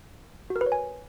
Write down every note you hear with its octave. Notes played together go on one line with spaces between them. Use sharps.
F#4
A#4
B4
C#5
G#5